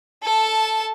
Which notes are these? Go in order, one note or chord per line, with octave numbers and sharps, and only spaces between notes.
A4 A5